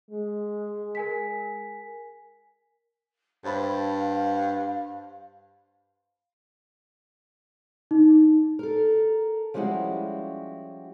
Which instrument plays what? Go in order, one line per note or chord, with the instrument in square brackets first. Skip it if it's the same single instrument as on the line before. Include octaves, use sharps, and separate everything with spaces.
[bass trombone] G#3
[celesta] A#4 G#5 B6
[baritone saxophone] G2 [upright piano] C5 A5 B5 [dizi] F5
[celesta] D#4
[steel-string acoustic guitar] A4 A#4
F3 G3 G#3 C#4 E4 F#4